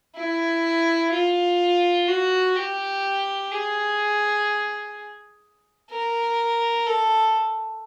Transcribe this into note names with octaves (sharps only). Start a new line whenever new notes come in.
E4
F4
F#4
G4
G#4
A#4
A4